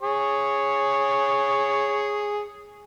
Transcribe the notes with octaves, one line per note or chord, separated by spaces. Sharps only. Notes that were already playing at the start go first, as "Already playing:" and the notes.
G#4 C#5